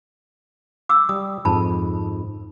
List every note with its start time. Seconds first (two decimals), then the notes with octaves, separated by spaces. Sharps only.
0.89 D6 E6
1.09 G3 D#6
1.45 F2 G#2 A5 B5